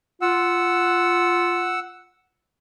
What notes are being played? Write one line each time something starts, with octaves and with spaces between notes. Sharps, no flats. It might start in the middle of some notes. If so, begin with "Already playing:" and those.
F4 F#5 E6